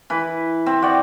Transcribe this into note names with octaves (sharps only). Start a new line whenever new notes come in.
E3 B4
C4
F#4 D5 G5